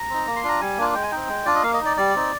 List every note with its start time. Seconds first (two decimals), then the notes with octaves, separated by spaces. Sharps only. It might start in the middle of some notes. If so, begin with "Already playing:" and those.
Already playing: A#5
0.10 C4 D#4
0.27 A#3
0.36 C6
0.44 D4 F4 A#5
0.61 G3 G#5
0.78 A#3 D4 F4
0.94 G#3 G5
1.03 G#5
1.11 C4 D#4 G5
1.28 G#3
1.46 D4 F4 D5
1.55 D#5
1.63 A#3 F5
1.74 D#5
1.81 D#4 D5
1.97 G3 D5
2.15 C4 D#4